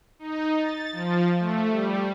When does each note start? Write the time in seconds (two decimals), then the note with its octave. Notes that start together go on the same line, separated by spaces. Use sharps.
0.19 D#4
0.59 A6
0.92 F3
1.39 A3
1.71 G3